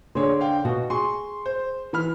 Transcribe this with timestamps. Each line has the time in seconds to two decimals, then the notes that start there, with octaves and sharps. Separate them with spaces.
0.15 D3 G#4 C5 C#5
0.41 F5 G5
0.65 B2 F#4 D#5
0.90 G#4 C6 C#6
1.46 C5
1.93 E3 B5 F6